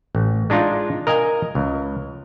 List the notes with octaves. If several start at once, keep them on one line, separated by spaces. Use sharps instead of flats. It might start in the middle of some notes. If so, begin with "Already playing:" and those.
A1
G#3 D4 D#4 F4
A#4 D#5 F5 G#5
C#2